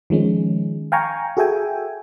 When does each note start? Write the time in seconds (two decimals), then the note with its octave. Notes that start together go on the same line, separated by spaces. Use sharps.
0.10 D#3 F3 G#3 C#4
0.92 F5 G5 G#5 A#5 C#6
1.37 F#4 G#4 A4 E5 G5 G#5